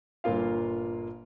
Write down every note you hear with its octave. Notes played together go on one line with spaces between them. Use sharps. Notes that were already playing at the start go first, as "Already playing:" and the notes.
G1 A#2 A#3 F4 F5